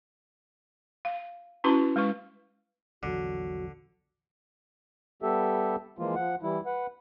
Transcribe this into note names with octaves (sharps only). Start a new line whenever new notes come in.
F5
C#4 E4 F#4 B4 A5 C6
G#3 B4 F5 C#6
A#1 E2 D3 F#3 F#4
G3 B3 G4 A4 E5
E3 F3 G#3 A#3 F4
F3 F#5
E3 G3 E4
B4 F#5